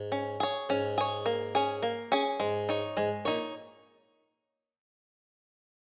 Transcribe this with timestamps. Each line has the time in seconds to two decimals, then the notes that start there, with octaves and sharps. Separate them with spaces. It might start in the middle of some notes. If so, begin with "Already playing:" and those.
Already playing: G#2
0.12 C#4
0.40 G#4 C#5
0.69 G#2 C#4
0.98 G#4 C#5
1.26 A#3
1.55 C#4 G#4
1.82 A#3
2.12 C#4 G#4
2.40 G#2 G#3
2.69 D#4 C#5
2.97 G#2 G#3
3.25 A#2 D#4 C#5